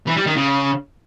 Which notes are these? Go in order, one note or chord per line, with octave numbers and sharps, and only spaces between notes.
E3
G3
D#3
C#3